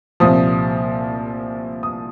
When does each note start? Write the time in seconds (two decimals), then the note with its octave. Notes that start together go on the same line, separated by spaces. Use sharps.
0.20 C2 A#2 F3 D#6
1.83 D#6